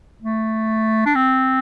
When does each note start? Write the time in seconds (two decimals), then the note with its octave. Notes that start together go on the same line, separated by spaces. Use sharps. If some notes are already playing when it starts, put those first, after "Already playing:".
0.22 A3
1.06 D4
1.15 C4